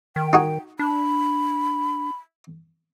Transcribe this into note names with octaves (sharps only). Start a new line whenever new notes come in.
D#3 G5
D#4 F#4 G#4
D4 B5